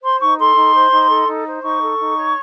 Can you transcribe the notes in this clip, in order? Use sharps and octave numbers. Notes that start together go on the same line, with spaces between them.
C5 C6
D#4 C#6
A4 C6
D#4
C5
D#4
A4
D#4
C5
D#4 C#6
A4
D#4
C#5